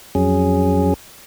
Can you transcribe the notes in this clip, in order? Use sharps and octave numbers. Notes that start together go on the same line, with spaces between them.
F2 F#3 C#4 G#4